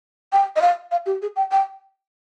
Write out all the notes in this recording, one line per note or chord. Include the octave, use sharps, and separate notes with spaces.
G5
D#5
F5
F5
G4
G#4
G5
G5